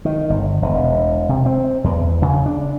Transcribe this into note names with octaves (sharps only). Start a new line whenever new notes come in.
D#3
G1
E1
E1
C3
C4
E2
C#3
D4